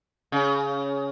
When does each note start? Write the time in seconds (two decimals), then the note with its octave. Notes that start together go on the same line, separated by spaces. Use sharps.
0.32 C#3